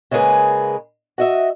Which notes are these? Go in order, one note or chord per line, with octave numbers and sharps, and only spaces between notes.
C#3 G#3 A#3 C#4 G#4 B4
F#4 D#5 E5